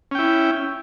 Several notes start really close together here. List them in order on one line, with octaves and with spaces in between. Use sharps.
C#4 G5 E4